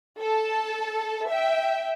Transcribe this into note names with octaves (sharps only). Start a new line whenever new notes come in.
A4 A5
E5 G5